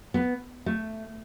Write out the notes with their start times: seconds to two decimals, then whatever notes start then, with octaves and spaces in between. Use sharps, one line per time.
0.14 B3
0.66 A3